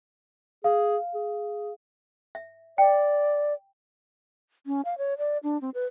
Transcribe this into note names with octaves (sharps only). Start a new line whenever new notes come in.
G#4 F5
G#4
E5
D5 G5
C#4
F5
C#5
D5
D4
C4
B4